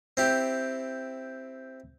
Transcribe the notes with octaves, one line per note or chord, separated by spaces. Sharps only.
C4 E4 G4